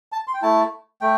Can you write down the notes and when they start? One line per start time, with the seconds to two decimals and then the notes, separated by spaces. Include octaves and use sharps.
0.12 A5
0.27 C6
0.34 G5
0.42 A3 E4 A5
1.01 A3 G5